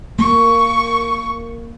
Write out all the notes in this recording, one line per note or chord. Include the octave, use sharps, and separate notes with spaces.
A#3 C#6